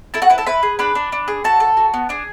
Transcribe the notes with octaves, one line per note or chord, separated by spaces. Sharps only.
E4 A4 A5
F#4 F#5
E4 B4
A4 A5
E4 B4 B5
G#4
D4 B4 B5
D4
D4
G#4
F#4 A4 A5
A4
F#4
B3
D4 G#4 G#5